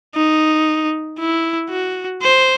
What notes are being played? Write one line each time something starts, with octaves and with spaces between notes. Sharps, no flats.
D#4
E4
F#4
C5